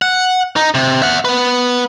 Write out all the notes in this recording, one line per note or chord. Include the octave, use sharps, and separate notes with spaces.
F#5
D#4
C3
E5 F#5
B3 B4